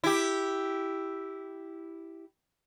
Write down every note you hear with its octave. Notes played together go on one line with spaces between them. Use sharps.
E4 G4